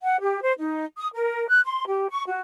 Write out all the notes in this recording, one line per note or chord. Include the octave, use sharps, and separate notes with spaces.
F#5
G4
C5
D#4
D#6
A#4
F#6
C6
G4
C#6
F#4